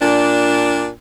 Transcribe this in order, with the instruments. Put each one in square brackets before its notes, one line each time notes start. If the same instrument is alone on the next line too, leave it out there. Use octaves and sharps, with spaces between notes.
[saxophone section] A#2 D4